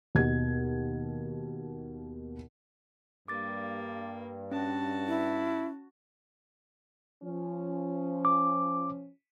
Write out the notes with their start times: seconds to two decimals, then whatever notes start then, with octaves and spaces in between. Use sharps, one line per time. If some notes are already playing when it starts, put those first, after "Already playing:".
0.15 D#2 B2 G#6
3.28 G2 A#3 D6 A6
4.51 C#4 F#4 A5
5.07 E4
7.23 F3 C#4
8.25 D6